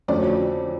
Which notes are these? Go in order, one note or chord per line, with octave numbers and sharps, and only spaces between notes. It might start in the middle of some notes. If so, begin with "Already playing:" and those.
F2 D3 F#3 A3 C#4 D5